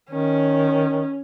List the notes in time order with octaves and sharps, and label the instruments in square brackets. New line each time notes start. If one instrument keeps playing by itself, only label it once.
[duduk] D#3 [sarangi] C#4